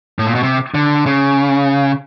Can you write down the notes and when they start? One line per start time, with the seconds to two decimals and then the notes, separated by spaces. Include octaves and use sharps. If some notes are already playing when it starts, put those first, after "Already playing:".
0.19 A2
0.27 A#2
0.35 B2
0.43 C3
0.74 D3
1.06 C#3